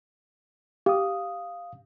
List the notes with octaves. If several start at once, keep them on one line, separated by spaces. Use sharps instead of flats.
G4 F5 D#6